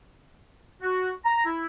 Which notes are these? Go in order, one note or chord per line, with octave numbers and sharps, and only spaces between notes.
F#4
A#5
E4